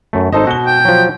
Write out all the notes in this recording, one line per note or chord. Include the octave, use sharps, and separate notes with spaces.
F#2 A3
G#1 D#4 A4 C5 D#5
B2 F#4 G7
G5
F3 F#3